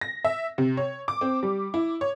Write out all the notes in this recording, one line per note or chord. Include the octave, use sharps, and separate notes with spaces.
A#6
E5
C3
C#5
D6
C4
G3
E4
C#5